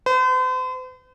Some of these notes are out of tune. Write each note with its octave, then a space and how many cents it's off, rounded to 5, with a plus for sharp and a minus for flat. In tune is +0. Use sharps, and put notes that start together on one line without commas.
C5 -45